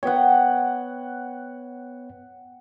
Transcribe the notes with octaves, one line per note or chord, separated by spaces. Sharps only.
B3 C#5 F#5 G5